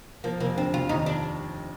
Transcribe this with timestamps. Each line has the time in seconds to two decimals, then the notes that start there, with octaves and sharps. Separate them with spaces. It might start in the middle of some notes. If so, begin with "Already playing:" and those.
0.24 F3 A#3
0.40 F1 A#3
0.57 D3 C4
0.73 F1 F4
0.89 D#2 D#4
1.06 D4